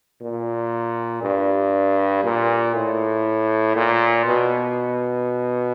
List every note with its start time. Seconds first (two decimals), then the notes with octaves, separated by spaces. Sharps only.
0.21 A#2
1.22 G2
2.24 A#2
2.75 A2
3.76 A#2
4.26 B2